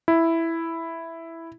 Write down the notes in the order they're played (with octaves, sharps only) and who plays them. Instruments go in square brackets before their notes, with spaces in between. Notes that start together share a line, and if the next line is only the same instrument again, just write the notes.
[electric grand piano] E4